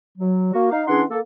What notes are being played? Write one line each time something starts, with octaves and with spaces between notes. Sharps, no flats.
F#3
A#3 F#4
D#4 F5
E3 C#4 D4 G#4 F#5 C6
A#3 A4